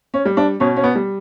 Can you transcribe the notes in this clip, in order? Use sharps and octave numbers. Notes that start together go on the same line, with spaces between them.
C#4
G3
D4
B2 C#4
C#4
B3
G3